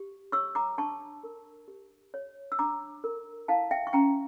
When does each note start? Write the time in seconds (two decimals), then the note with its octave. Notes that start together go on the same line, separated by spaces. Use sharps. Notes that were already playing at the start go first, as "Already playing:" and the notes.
Already playing: G4
0.32 C#5 C#6 E6
0.55 A#5 D6
0.78 D4 A5 C#6
1.24 A#4
1.68 G4
2.14 C#5
2.52 E6
2.59 D4 A#5 D6
3.04 A#4
3.48 E4 F5 A5
3.71 E5 G5
3.87 C#6
3.93 C#4 G5 A#5